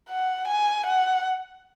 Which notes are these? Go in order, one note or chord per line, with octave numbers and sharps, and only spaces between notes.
F#5
G#5
F#5